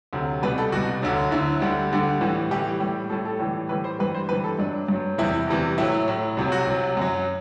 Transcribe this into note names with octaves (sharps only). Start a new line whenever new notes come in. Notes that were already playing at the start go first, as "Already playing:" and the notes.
D2 C3 F#3
C2 B2 G3 B4
A4
C2 B2 G3 F#4
D2 D3 F#3
D2 D3 F#3 E4
D2 D3 G3
D2 D3 G3
A2 E3 G3
A2 E3 G3 G4
A2 G3
A2 G3 A4
A4
A2 E3 G3
A2 E3 G3 B4
C5
G2 E3 G3 B4
C5
G2 E3 G3 B4
A4
G2 F#3 D4
G2 F#3
E2 C3 E3 G3 E4
E2 C3 E3 G3
A2 F#3 E4
A2 F#3
C2 C3 F#3
F#4
C2 C3 F#3
F#2 F#3